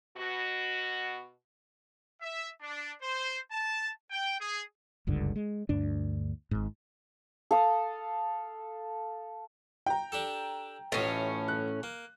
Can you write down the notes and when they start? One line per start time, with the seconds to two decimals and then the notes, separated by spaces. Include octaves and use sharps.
0.17 B2 F#4
2.21 E5
2.62 D4
3.02 C5
3.51 A5
4.11 G5
4.41 G#4
5.07 F#1 C#2 G2 D3
5.36 G#3
5.69 D2 G2 D4
6.51 G#1 G#2
7.51 A4 F5 D#6
9.86 G5 A#5
10.12 D4 G4 A4
10.92 A1 A2 C#4 F4 D#5
11.48 F#6
11.83 A#3